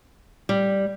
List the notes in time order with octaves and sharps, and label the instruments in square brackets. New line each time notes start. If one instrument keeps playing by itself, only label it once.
[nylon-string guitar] G3